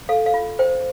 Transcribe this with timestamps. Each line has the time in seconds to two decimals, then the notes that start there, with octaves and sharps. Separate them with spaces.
0.09 A4 F5
0.26 F5
0.34 F4
0.59 C5 G5